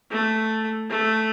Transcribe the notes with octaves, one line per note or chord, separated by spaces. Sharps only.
A3
A3